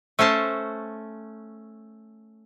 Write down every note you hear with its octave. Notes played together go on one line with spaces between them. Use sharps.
A3 C#4 C5 A5